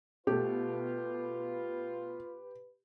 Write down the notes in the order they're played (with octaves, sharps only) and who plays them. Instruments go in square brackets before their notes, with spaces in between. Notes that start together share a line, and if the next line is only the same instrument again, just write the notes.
[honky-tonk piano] B2 A3 [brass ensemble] F4 [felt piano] G4 [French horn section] B4